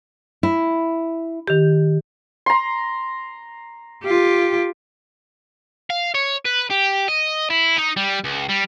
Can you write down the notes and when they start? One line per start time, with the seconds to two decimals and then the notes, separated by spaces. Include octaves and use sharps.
0.43 E4
1.48 D#3 G4
2.46 A#5 C6
4.04 F4 G4
5.90 F5
6.15 C#5
6.45 B4
6.70 G4
7.08 D#5
7.50 E4
7.77 D#4
7.97 G3
8.24 C#2
8.49 G3